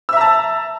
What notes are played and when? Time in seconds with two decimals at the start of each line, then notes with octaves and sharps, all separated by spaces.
0.09 E6
0.13 E5
0.17 A#5
0.21 A5